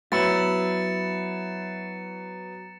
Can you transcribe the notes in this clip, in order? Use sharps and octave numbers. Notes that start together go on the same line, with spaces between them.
F#3 B3 E4 A6 C#7 E7